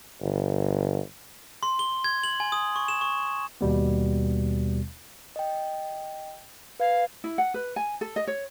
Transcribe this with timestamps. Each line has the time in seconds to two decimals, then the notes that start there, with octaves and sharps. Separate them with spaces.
0.21 G1
1.63 C6
1.79 G7
2.04 G#6
2.23 F#7
2.40 G#5
2.52 D#6
2.76 C#6
2.88 E7
3.01 C#6
3.61 D#2 B2 G3 B3
5.36 D#5 G5
6.80 B4 F5 G#6
7.24 E4
7.38 F#5
7.54 B4
7.76 G#5
8.01 A4
8.16 D#5
8.27 C#5